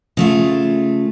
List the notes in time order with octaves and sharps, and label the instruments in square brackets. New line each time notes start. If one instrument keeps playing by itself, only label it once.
[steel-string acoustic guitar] C#3 A3 F4